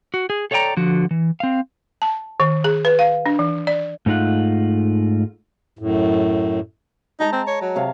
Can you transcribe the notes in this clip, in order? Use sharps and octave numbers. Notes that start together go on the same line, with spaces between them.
F#4
G#4
A4 C#5 D5 E5 G5 A#5
D3 F3 F#4
E3
C4 F5
A5
D#3
G#4
B4
F5
D4
E3
D5
G#2 A3 D#4 F4 F#5
F#2 A2
G#3 D#4 A5 A#5
C4
C#5
F#3
C3 C#5 F5